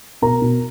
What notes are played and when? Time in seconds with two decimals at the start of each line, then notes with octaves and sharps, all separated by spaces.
0.22 B2 A#4 A#5
0.42 B2